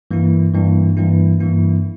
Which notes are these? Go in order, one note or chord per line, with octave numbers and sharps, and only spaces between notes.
G2 E3 A#3 E4
G2 E3 A#3 E4
G2 E3 A#3 E4
G2 E3 A#3 E4